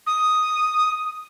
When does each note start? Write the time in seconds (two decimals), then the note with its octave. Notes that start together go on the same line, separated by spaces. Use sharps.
0.07 D#6